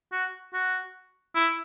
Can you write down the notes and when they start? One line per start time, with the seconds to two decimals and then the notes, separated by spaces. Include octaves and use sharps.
0.12 F#4
0.54 F#4
1.35 E4